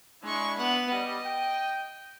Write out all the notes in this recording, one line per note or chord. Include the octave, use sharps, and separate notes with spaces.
G#3 D4 E4 C#6
B3 F#5
G3 D#5
G5